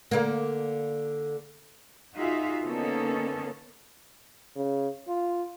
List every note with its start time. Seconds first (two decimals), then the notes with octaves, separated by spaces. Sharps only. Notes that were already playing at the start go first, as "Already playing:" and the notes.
0.11 D3 A#3
2.15 D#4 F4 F#4 G#4 E5 F5
2.62 D3 A#3 B3 C#4 D#4 A4
4.56 C#3
5.08 F4